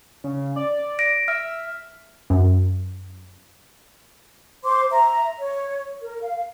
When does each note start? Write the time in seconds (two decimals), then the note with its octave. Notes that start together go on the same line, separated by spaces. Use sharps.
0.24 C#3
0.56 D5
0.99 A#6 D7
1.28 E5 F6
2.30 F#2
4.63 C5 C6 D6
4.90 E5 A#5
5.39 C#5
6.01 A#4
6.22 F5